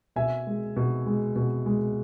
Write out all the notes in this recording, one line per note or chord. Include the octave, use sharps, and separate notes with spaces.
B2 E5 G#5
G#3
B2
G#3
B2
G#3